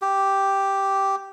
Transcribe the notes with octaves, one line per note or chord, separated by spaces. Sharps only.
G4